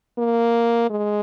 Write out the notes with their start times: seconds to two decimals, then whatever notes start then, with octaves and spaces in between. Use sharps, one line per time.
0.19 A#3
0.90 G#3